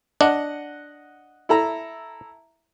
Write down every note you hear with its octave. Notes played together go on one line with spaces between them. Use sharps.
D4 D#5 F#5
E4 A4 A#5